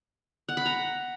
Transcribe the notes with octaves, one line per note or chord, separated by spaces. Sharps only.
F#5
B5
A#5